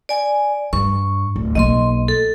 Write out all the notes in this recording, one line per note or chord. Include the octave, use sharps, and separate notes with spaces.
D5 G#5
G2 C#6
D1
B1 A#3 D#5 C6
A4